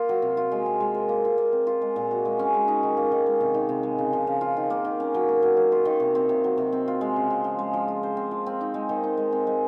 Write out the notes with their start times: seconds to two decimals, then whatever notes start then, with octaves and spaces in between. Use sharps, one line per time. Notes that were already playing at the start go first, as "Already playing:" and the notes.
Already playing: A#3 F4
0.09 F#3
0.22 C3
0.37 F4
0.52 G#3
0.66 C4
0.80 G#3
0.94 A#4
1.09 A#3
1.25 F4
1.38 A#3
1.52 C4
1.67 F4
1.82 G#3
1.96 A#2
2.11 F#4
2.25 G#3
2.39 C#4
2.54 G#3
2.68 D#4
2.83 D#3
2.97 A#3
3.12 D#3
3.26 G#3
3.40 C3
3.54 D#3
3.69 C3
3.83 G#3
3.99 C#3
4.13 F3
4.27 C#3
4.41 F4
4.57 D#3
4.70 A#3
4.85 D#3
5.00 C#4
5.14 F#3
5.29 A#3
5.42 F#3
5.57 A#3
5.72 F4
5.85 D#3
6.00 C3
6.15 C4
6.29 C3
6.44 F#3
6.58 C3
6.72 C4
6.88 F4
7.01 G#3
7.16 C#3
7.30 C4
7.44 F3
7.59 G#3
7.73 F3
7.88 F4
8.03 C5
8.17 C4
8.31 F3
8.46 C4
8.61 D#4
8.74 G#3
8.89 D#3
9.04 D#4
9.17 G#3
9.32 C4
9.47 G#3